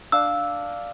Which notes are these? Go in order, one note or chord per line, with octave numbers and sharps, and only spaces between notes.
D4 F5 E6